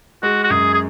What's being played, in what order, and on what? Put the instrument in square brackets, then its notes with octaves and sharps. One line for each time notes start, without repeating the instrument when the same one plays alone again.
[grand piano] G#3 [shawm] F#4
[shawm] F#4
[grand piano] F#2 [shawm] G#4
[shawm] G#4